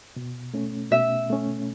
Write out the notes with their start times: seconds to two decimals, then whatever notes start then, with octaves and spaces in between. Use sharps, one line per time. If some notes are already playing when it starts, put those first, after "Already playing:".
0.16 B2
0.54 A3 C#4
0.91 B2 E5
1.30 A3 C#4